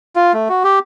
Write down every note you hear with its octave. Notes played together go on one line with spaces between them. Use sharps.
F4
A3
F#4
G4